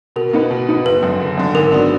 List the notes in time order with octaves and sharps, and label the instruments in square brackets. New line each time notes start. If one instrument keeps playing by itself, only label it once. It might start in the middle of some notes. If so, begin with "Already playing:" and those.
[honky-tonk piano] B2 [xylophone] A#4
[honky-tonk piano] A#3 D#4 F#4 B4
B2
A#3 D#4 F#4 B4
[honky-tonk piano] F#1 [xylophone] B4
[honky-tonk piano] F#2 D3
F#1
F#2 D3
[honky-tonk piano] G#1 [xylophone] A#4
[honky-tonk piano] F#3 B3 D4